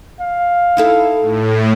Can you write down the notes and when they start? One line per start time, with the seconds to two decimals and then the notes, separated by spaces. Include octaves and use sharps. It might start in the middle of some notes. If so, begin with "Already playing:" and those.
0.20 F5
0.77 D#4 E4 A4
1.21 A2